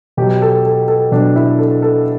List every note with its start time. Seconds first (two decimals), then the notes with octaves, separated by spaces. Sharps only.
0.17 B2 F#3 G4
0.42 A4
0.65 A4
0.88 A4
1.12 B2 F#3 D4
1.36 E4
1.59 A4
1.82 A4